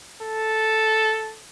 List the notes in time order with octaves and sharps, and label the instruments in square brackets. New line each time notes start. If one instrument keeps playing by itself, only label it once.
[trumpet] A4